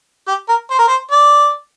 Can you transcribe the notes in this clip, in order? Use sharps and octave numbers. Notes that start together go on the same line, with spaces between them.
G4
A#4
C5
A#4
C5
D5